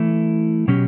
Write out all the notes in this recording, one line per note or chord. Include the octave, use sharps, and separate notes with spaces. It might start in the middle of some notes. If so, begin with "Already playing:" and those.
Already playing: E3 A3 E4
B2 F#3 C#4 G4